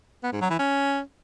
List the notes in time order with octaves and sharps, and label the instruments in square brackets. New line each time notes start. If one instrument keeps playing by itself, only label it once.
[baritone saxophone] B3
G#2
F#3
E3
C#4